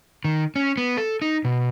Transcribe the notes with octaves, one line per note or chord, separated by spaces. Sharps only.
D#3
C#4
B3
A4
D#4
B2